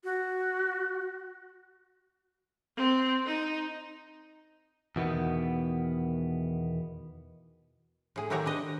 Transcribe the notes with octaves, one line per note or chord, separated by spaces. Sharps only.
F#4
C4
D#4
E2 B2 D#3 B3
A2 G#4
D#3 E4 F#4 G4 C#5 A#5
D4 B4 D#5